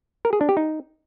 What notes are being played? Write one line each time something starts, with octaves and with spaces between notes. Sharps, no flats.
A#4
G#4
D4
G4
D#4